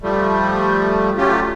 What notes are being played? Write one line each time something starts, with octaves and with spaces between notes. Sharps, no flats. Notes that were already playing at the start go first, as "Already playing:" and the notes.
F3 G3 A3
F#3 A3 C#4 F4 G4